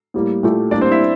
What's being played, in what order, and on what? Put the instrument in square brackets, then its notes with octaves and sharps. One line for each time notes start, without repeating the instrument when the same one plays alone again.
[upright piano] A2 G3 A#3
A#2 A3 E4 G4
[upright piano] A2 G3 A#3 [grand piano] D4 D5
[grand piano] C4 C5
E4 E5